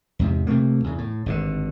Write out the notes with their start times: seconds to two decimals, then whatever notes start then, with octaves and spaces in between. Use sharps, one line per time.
0.19 E2 G#2 C3
0.47 C3 A3 A#3
0.84 E2 C#3
0.98 A2
1.26 G#1 G2 B2 D3